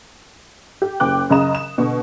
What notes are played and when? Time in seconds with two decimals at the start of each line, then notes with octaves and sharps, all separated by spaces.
0.82 G4
1.00 F#1 G5 D6 F#6
1.30 F#2 C#3 D#5 A#5 D#6 E7
1.55 E7
1.78 B2 D3